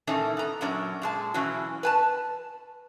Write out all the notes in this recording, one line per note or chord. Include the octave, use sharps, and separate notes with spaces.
A#2 E3 A3 C#4 D#4 A4
B3 A#5
F#2 A#2 F#3 C#4 D4
A#2 G#3 A5
B2 E3 F#3 C#4 F#4
B4 G#5 A5